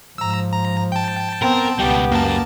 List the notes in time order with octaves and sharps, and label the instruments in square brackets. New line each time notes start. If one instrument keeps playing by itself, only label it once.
[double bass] G#2 F3 [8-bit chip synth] A#5 E6
[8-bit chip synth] A#5
G5 A5
[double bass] B3 [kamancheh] C4 [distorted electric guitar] A#4
[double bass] C#2 [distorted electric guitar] B2 G3 [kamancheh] B3 G4
[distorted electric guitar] F#2 [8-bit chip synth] A#3 A5